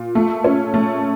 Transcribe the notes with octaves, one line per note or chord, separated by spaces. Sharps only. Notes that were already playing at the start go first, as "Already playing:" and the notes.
Already playing: A#2
A3
C#4
A3